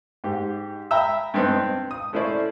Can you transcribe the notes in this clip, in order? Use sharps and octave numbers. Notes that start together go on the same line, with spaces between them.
G#2 G4
E5 G5 A#5 B5 E6
G2 B3 C4 D#4
C4
D#6
A3 C#4 E4 C5 D5